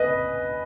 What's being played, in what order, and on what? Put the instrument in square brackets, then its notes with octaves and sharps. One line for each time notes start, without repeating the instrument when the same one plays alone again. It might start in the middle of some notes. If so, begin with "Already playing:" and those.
Already playing: [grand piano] B4 D#5